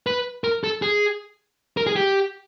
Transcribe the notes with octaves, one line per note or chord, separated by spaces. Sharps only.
B4
A#4
A4
G#4
A#4
G#4
G4